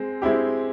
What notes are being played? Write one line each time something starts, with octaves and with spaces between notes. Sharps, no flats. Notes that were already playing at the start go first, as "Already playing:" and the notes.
Already playing: G#3 C4
G#3 C4 E4 G4